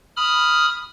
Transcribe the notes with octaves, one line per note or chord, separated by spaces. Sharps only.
B5 D#6 F6